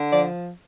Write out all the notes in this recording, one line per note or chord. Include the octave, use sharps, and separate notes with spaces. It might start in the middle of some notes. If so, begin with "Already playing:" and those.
Already playing: D3
F3 D5